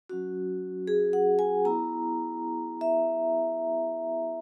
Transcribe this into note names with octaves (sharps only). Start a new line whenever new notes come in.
F#3 C#4 F#4
G#4
F#5
G#5
B3 E4 A#5
E5